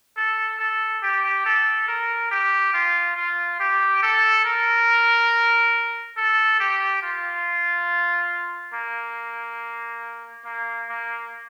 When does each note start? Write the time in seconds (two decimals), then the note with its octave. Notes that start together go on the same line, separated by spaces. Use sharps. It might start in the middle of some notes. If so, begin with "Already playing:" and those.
0.17 A4
0.59 A4
1.03 G4
1.46 A4
1.88 A#4
2.31 G4
2.73 F4
3.16 F4
3.60 G4
4.03 A4
4.45 A#4
6.17 A4
6.60 G4
7.02 F4
8.74 A#3
10.45 A#3
10.89 A#3